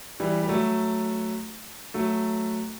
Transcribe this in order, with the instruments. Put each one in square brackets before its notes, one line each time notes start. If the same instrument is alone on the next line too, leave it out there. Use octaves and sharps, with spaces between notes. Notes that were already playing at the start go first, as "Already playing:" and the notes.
[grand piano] E3 G3
G3
F#3 A3
F#3 A3